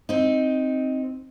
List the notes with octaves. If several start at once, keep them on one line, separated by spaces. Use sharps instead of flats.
C4 D#4